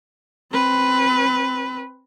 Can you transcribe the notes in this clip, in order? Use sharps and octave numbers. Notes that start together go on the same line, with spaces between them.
C4 B4